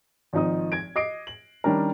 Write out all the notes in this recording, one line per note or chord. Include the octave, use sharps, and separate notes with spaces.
G#1 F3 D#4 D#6
G#6 D7
D#5 D6 D#6 C7 D7
F#7
D#3 G3 C#4 D4 A#4